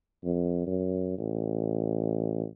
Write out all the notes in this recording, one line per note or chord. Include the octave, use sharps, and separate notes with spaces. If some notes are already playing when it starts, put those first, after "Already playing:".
F2
F#2
A1